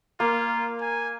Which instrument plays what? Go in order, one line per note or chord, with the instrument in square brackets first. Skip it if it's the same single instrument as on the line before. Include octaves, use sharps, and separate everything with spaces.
[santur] A#3 [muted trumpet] F4
[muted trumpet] G#5